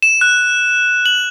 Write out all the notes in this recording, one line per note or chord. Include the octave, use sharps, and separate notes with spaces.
E7
F#6
F#7